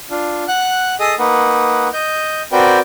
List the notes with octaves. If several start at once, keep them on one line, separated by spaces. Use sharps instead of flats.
D4 F4
F#5 F#6
G#4 A4 D#5 D#6
A#3 D#4 B4 F#5
D#5 G6
C4 F#4 A#4 B4 D5 G5